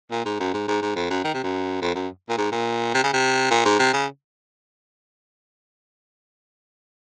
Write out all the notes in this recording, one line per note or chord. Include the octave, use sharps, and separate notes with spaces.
A#2
G#2
F#2
G#2
G#2
G#2
F2
F#2
D#3
C3
F#2
F2
F#2
A#2
G#2
A#2
C3
C#3
C3
A#2
G#2
C3
C#3